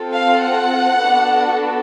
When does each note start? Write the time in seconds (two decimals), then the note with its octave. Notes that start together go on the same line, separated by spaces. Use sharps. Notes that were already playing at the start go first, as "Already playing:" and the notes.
Already playing: C4 F4 A4
0.11 F5
0.41 F#5
1.02 B3 D4 F#4 A4